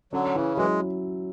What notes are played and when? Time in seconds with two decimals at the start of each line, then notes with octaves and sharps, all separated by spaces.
0.12 D3 F#3 C#4
0.34 C#3 E3 E4
0.57 E3 F#3 G#3